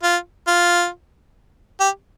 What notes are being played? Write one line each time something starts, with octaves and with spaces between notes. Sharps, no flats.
F4
F4
G4